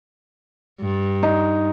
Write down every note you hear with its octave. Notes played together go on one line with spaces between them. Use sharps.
G2
D#4